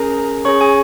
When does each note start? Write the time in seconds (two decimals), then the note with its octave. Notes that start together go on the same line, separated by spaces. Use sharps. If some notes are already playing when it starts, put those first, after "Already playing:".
Already playing: C#4 G#4 A#4 A#5
0.45 C#4 G#4 C#5 C#6
0.61 G#4 G#5